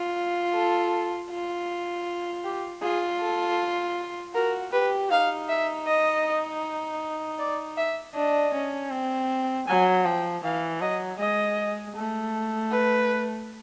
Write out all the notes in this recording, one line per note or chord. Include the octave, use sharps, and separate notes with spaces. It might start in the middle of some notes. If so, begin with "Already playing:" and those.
Already playing: F4
A4
F4
G4
F4 G#4
A4
F#4 A#4
G4 B4
D#4 F5
E5
D#5
D5
E5
D4 D#5
C#4
C4
F#3 G#5
F3 G5
E3 F5
F#3 D#5
G#3 D#5
A3
B4